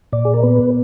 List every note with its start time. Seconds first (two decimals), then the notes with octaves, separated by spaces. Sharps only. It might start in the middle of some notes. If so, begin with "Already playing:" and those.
0.12 A#2 D5
0.25 G#4
0.34 A#4
0.43 B3 B4